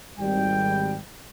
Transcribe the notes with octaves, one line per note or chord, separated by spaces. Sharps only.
G#1 G3 G5